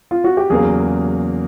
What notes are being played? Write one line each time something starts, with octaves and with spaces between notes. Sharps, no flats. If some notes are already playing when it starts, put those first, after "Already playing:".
F4
F#4
G4
E2 C#3 F#3 A#3 G#4